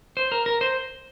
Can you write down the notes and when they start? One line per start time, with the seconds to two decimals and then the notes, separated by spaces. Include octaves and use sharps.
0.17 C5
0.32 A#4
0.46 A#4
0.61 C5